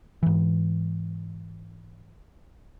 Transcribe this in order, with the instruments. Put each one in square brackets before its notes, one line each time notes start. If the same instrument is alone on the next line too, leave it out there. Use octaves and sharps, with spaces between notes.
[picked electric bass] G#2 E3